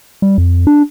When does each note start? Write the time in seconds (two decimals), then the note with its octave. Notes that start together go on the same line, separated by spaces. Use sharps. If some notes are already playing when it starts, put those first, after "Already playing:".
0.22 G3
0.38 F2
0.67 D4